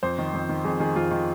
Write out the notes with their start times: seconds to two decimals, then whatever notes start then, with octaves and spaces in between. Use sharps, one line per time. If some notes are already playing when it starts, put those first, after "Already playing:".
0.03 F2 C5
0.19 D#3
0.33 F2
0.49 D#3
0.65 F2 G#4
0.80 D#3 G#4
0.96 F2 F4
1.11 D#3